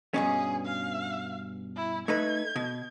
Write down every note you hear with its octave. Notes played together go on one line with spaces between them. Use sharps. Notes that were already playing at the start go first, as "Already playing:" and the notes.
G2 B2 C#4 G#4
F5
E4
A3 D#4 B4 G#6
B2